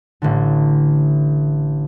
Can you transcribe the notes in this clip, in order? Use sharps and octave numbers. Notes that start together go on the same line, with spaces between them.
A1 A2 D3